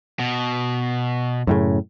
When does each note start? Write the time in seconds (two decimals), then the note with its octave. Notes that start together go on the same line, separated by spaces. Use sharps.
0.19 B2
1.47 F#2 A2 C#3